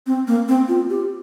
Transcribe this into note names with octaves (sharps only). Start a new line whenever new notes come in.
C4
A#3
C4
F4
G4